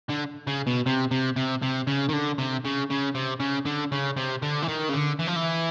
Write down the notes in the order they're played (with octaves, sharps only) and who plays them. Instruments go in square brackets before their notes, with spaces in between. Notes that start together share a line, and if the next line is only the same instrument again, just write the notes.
[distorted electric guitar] D3
C#3
B2
C3
C3
C3
C3
C#3
D#3
D3
C3
C#3
C#3
C3
C#3
D3
C#3
C3
D3
E3
D#3
C#3
D3
E3
F3
E3